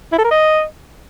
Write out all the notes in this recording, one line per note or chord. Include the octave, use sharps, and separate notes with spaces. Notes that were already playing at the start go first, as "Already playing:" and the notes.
E4
A4
A#4
D#5